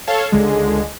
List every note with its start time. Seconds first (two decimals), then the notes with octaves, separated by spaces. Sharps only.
0.07 A4 C#5 F5 A5
0.32 C#2 D3 G#3